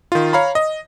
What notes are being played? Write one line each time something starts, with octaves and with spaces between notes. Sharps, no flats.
D#3 F4
C#5 F5 A#5 B5
D#5